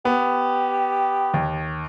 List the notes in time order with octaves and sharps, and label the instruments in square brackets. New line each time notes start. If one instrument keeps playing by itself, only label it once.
[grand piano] B3 [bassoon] G4
[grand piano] D#2